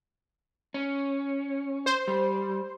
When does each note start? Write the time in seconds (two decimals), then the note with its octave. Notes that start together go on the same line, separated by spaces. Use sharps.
0.74 C#4
1.86 C5
2.08 G3